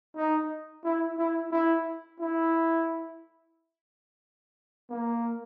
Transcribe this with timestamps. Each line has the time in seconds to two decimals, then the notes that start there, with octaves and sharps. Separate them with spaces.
0.16 D#4
0.84 E4
1.18 E4
1.52 E4
2.20 E4
4.90 A#3